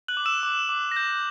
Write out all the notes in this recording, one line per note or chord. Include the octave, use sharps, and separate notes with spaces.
F#6 F#7
D6
E6 E7
D6
D6
A#6
G6